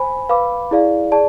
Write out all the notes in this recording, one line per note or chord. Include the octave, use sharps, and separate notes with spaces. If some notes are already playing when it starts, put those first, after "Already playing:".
Already playing: C5 G#5 B5
B4 F5 B5 D6
E4 G#4 D5 F5
G#4 D5 A5